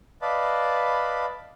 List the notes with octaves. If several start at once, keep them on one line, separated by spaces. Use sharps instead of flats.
B4 D5 D#5 F5 A5 B5